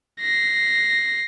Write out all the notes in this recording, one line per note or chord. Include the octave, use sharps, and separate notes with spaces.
A#6 C7